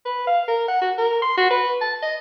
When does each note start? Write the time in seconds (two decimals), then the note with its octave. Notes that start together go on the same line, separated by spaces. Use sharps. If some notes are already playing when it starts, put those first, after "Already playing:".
0.06 B4
0.27 F5
0.48 A#4
0.68 F#5
0.81 F#4
0.98 A#4
1.22 C6
1.37 F#4
1.51 B4
1.81 A5
2.02 D#5